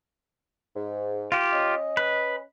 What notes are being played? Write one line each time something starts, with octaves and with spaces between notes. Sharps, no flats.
G#2
F4 G4
C#4 D#5
B4